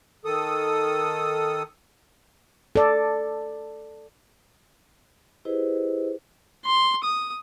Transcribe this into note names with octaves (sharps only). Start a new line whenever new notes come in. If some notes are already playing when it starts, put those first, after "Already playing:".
D#3 A4 D#6
A4 D5
E4 G4 G#4 B4 C5 D#5
C6
D#6